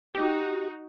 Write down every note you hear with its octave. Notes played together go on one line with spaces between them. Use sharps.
D#4 F#4 G4